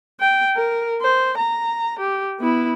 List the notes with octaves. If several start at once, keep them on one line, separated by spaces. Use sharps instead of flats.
G5
A#4
C5
A#5
G4
B3 E4